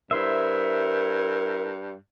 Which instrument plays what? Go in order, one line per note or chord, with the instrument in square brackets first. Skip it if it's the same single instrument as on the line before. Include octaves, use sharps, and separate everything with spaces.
[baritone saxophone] G2 [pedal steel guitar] E4 C5 E5 [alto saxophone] A#4